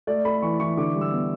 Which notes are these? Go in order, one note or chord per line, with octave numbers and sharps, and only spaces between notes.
A3 D5
A3 B5
E3 C#6
E3 C#6
D3 D6
G3
E6
B3